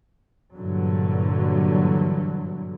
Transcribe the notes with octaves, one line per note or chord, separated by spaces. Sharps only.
G2 A#2 D3 E3 F#3